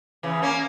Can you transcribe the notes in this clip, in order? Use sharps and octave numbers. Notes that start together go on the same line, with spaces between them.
C#3 E3
A#3 C#4